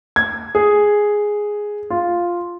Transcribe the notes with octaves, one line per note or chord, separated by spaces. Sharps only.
G#6
G#4
F4